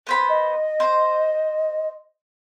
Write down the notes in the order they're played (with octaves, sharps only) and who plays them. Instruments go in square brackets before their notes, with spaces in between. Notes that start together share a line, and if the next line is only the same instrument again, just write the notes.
[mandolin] B3 C5 B5
[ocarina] D#5
[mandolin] C5